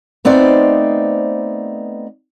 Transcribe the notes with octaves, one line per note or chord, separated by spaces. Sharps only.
A3 B3 C4 D#4 C5 D5